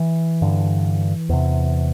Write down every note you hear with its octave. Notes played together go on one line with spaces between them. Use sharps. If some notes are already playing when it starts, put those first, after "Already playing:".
Already playing: E3
G2 D3
E2 C3